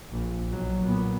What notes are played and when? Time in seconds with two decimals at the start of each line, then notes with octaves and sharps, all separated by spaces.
0.10 A#1
0.51 B1 F#3
0.82 A#2 B3